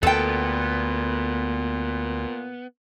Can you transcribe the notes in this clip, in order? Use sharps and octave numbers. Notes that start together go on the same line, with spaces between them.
D2 A#2 B3 A4 G5